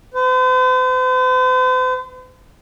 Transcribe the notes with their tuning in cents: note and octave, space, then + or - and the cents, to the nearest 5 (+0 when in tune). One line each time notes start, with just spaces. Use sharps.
C5 -45